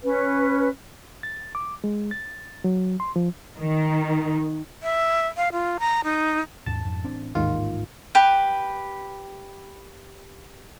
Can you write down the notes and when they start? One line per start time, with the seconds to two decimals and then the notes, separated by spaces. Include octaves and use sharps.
0.03 C#4 B4
1.23 A6
1.55 D6
1.84 G#3
2.11 A6
2.64 F#3
3.00 C6
3.16 F3
3.58 D#3
4.83 E5
5.37 F5
5.52 F4
5.80 A#5
6.04 D#4
6.66 D#2 G#2 A5
6.85 F2 G#2
7.04 A1 C4 D4
7.35 A1 D#2 G#2 D#3 G#3 F4
8.15 G4 B4